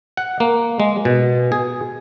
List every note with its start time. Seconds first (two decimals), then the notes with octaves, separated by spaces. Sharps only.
0.17 F#5
0.40 A#3
0.80 G#3
1.05 B2
1.52 G#4